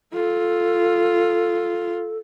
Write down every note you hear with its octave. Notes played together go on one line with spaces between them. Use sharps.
F4 A4